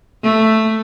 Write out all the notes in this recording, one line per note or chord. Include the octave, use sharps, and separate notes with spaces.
A3